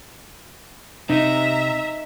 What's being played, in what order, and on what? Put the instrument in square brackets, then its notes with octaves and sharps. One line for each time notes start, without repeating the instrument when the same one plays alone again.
[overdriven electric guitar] C3 [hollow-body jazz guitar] D#4 [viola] E5 A#5